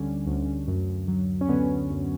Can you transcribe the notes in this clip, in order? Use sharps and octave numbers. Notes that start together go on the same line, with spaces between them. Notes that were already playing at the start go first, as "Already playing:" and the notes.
Already playing: D2 D3 G3 C#4 D4
D2
F#2
F#3
C#4
D3 B3
F#2